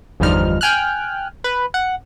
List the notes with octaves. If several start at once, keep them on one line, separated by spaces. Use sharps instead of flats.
G1 E2 F3 G3 D#4 F6
G5 G#5 F6 F#6
B4
F#5